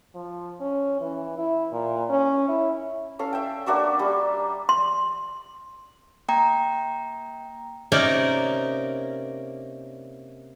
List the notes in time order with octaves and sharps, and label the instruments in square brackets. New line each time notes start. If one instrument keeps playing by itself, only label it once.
[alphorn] F3
C#4
E3
E4
A#2
C#4
E4
[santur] C#4 A4 F5
E5 G5
A#3 D4 F#4 E5
G3
[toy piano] C6
[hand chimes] A#3 G5 A#5
[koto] C3 A#3 C#4 D#4 A#4 D5